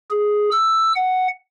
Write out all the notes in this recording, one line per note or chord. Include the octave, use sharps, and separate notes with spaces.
G#4
E6
F#5